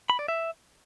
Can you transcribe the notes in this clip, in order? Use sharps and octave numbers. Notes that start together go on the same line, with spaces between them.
B5
D5
E5